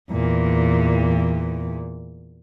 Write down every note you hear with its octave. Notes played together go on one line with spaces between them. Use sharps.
E2 A#2